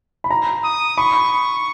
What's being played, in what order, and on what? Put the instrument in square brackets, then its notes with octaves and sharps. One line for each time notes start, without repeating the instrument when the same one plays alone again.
[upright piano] B5
A#5
[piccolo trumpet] D#6
[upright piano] B5 [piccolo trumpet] C#6